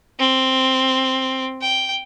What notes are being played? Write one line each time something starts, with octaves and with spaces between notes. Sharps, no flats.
C4
G5